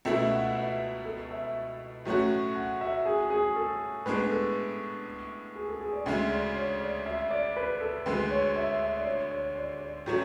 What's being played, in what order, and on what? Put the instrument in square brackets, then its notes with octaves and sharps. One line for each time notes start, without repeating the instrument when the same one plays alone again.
[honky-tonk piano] C#2 B2 A3 E4 [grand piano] E5
[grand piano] F#5
E5
A4
E5
[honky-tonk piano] A2 F#3 A3 C#4 F#4
[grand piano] F#5
E5
G#4
G#4
A4
[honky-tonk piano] A2 G#3 B3 D4 [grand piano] B4
[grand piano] A4
G#4
A4
G#4
D5
[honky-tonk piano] D2 C#3 G#3 [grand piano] E5
[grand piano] D5
C#5
D5
E5
D5
B4
A4
[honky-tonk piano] D2 D3 G#3 [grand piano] B4
[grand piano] C#5
E5
E5
D5
C#5
C#5
D5
D5
[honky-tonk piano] A2 F#3 A3 C#4